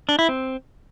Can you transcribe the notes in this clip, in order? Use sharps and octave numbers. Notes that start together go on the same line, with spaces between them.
D4
E4
C4